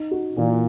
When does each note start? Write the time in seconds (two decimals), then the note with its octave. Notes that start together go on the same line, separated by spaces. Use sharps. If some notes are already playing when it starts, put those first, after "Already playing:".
Already playing: D#4
0.11 F#4
0.37 A#2 E3